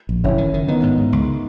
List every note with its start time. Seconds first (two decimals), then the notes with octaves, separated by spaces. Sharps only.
0.09 A#1
0.24 F#1 C#4 E4
0.38 D#3
0.54 D#3
0.68 D#3 B3 D#4
0.83 G#2
0.97 G#2
1.12 C#2